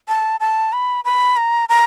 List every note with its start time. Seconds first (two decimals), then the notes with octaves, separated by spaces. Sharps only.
0.08 A5
0.40 A5
0.73 B5
1.05 B5
1.37 A#5
1.69 A#5